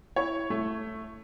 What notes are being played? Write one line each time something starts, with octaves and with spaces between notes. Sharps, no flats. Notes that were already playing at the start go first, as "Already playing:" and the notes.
E4 C#5
A3